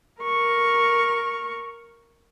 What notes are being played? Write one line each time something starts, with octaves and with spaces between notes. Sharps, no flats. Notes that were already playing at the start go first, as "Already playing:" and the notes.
A#4 C#6